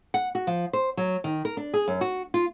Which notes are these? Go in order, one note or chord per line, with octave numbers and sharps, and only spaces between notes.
F#5
F#4
F3
C5
F#3
D#3
A#4
D4
G#4
F#2
F#4
F4